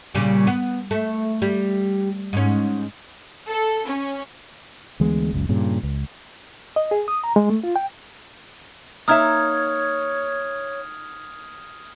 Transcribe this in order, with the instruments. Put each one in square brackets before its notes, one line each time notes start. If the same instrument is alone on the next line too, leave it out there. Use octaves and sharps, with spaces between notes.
[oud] A#2 C#3 G3
B3
A3
G3
G#2 C#4
[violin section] A4
C#4
[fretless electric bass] D2 E3 G#3 B3
F#1 C#2 F#2
G2 A#2 C#3
C#2
[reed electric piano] D#5
G#4
D#6
A#5
G#3
A3
F4
G5
[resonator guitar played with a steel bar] A#3 D#4 E5 [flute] C#5 [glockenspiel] D#6 F6 G#6